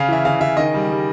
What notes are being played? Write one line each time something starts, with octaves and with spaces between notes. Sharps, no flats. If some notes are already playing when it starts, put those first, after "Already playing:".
Already playing: C#3 F5
E3 E5
C#3 F5
C#3 E5
D#3 D#5
G3
G3